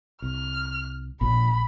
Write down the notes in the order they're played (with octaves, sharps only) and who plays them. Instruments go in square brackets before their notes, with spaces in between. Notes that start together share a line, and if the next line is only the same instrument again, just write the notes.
[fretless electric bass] C2 [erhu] F6
[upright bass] A#1 [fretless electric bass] A#2 F3 D4 [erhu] B5